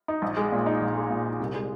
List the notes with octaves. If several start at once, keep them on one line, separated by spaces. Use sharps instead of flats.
D#4
A#1
G#3
A#2
D#4
A#1
G#3
A#2
D#4
C2
G#3